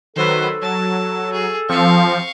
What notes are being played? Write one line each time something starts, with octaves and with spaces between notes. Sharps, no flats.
D#3 F#3 A4 B4 C5
F#3 A5
G#4
F3 C4 F5 C#6